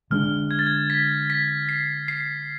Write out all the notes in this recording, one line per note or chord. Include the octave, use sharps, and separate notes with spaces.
D3 G#3 B3 D4 F6
G#6
A6
G#6
B6
B6
C7
C7